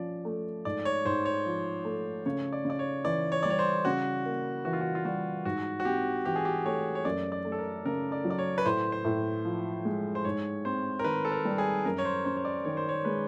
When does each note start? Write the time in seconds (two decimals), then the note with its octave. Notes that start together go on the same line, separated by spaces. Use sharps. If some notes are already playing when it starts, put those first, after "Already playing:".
Already playing: F3 C#4 D5
0.25 A3
0.65 G#2 D5
0.85 C#5
1.05 G#2 C5
1.25 C#5
1.46 F3
1.85 A3
2.26 C#3 C#5
2.53 D5
2.65 C#3
2.70 D5
2.79 C#5
3.05 E3 D5
3.32 C#5
3.43 G3 D5
3.50 C#5
3.59 C5
3.85 C#3 F#4
4.26 A#3
4.65 E3 F#4
4.73 F4
4.81 F#4
4.95 F4
5.05 G3 F#4
5.45 G#2 F#4
5.80 F#4
5.85 C4 G4
6.25 E3 G4
6.36 G#4
6.45 G4
6.65 A3 C#5
6.95 C#5
7.05 F#2 D5
7.32 D5
7.45 A3
7.52 A4
7.59 A#4
7.85 C#3 A#4
8.12 D5
8.25 F#3
8.30 D5
8.38 C#5
8.58 B4
8.65 A2 C5
8.92 C5
9.04 A2
9.45 F3
9.85 G#3
10.15 C5
10.25 G#2 C#5
10.65 C4 C5
10.99 A#4
11.04 D#3 B4
11.25 A4
11.32 A#4
11.45 G3
11.58 G#4
11.85 F#2 A#4
11.98 C#5
12.05 C5
12.25 C#4 C5
12.37 C#5
12.45 D5
12.65 D#3 C#5
12.77 C5
12.89 C#5
13.05 G#3 B4